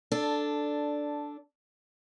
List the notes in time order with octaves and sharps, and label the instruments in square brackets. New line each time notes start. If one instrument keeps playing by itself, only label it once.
[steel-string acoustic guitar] D4 A4